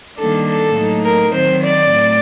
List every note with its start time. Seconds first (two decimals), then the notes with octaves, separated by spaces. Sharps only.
0.18 D#3 G3 A#3 D4 A4
0.47 A4
0.77 A2 F#3 A#3 D#4
1.05 A#4
1.34 D#3 F#3 C4 C5
1.63 D5
1.91 A2